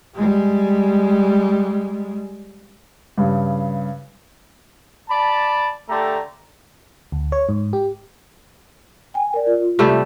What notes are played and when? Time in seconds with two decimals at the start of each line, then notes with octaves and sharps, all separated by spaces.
0.15 G3 G#3
3.18 G2 C#3
5.10 D5 A5 B5
5.89 D3 A3 G4 A#5
7.12 D2
7.32 C#5
7.49 G#2
7.73 G4
9.14 G5 G#5
9.34 A#4 D5
9.47 F4
9.79 C3 G3 A3